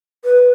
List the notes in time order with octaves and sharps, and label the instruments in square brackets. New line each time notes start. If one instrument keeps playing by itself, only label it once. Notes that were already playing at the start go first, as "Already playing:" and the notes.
[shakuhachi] B4